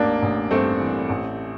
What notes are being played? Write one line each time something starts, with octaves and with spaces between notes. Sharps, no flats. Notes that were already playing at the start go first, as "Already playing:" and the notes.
Already playing: A1 E2 A#3 D4
A1
G2 A3 C4
E3
A1